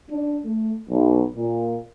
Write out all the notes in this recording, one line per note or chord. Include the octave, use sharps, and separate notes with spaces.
D4
A3
B1
A#2